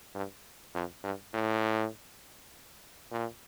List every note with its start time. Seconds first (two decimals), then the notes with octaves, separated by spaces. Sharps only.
0.15 G2
0.75 F2
1.04 G2
1.34 A2
3.12 A#2